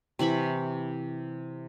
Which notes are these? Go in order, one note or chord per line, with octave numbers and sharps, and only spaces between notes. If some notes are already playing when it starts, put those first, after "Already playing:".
C3 E3 B5 C#6